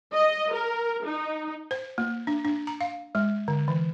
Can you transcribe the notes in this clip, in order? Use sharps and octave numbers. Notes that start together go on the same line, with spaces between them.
D#5
A#4
D#4
C5
A#3
D4
D4
A#5
F5
G#3
D3
E3